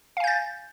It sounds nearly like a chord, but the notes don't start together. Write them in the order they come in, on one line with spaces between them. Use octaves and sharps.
F5 G#5 G6 A6